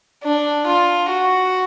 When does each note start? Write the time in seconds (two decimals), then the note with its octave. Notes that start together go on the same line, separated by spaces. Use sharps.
0.24 D4
0.67 F4
1.09 F#4